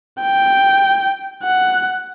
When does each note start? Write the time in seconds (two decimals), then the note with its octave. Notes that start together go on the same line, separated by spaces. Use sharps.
0.21 G5
1.43 F#5